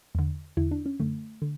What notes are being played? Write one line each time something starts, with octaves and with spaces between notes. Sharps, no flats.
E2 D3
E2 D3 E4
D4
C#4
F#2 D3 A3
D3